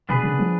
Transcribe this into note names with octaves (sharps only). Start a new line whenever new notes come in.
B2 B3 D4 G#4 B4
C#3
F3